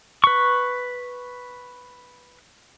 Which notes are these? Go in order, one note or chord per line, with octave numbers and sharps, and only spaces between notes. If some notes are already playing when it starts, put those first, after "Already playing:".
B4 C#6